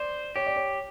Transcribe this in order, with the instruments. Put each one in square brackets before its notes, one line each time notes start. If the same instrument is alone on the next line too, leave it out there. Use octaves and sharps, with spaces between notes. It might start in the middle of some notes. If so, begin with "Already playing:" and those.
Already playing: [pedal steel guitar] C5 [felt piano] D5
[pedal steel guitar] G4 [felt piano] C#5
[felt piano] D5
C#5